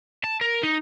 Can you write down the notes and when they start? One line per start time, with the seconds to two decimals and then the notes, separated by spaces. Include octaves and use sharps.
0.24 A5
0.41 A#4
0.63 D#4